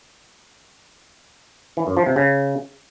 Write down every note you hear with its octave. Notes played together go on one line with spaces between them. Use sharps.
E3
F#2
F3
C3
C#3